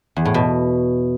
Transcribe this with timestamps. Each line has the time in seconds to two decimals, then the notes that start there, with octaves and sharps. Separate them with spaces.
0.16 E2
0.25 A2
0.34 B2